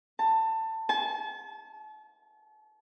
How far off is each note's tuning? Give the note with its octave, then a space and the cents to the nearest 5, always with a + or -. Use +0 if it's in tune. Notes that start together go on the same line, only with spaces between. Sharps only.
A5 +20
A5 -40